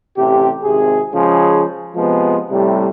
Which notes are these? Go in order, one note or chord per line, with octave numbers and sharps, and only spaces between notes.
A1 C3 G4
G#1 C3 G#4
C#3 F3 G#3 G#4
C3 F3 G#3 B3
A2 C3 G3